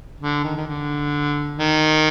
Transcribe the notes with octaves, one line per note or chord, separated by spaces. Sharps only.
D3
D#3
D#3
D3
D#3